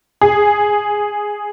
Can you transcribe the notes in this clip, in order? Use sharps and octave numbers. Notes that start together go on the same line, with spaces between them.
G#4